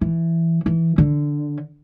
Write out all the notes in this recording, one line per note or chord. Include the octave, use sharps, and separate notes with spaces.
E3
E3
D3